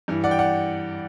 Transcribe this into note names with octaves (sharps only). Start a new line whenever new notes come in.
G2 E3
D5 F#5
G5
D5 F#5